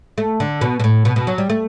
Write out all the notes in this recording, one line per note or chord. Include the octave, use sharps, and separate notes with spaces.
A3
D3
B2
B2
A2
B2
B2
F#3
G3
A3